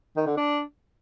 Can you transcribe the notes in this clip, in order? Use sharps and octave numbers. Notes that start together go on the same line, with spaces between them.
D#3
D3
D4